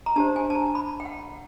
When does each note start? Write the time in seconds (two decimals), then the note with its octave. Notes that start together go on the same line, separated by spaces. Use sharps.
0.06 A#5
0.16 D4 G4 C5 A5
0.36 G#5
0.50 A5
0.55 A#5
0.75 B5
1.00 G5
1.05 F#5